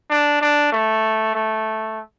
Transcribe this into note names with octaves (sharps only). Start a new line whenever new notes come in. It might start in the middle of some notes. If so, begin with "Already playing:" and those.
D4
D4
A3
A3